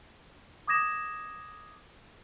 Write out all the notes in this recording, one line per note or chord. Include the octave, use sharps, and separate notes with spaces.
D6 D#6 G#6 A#6 E7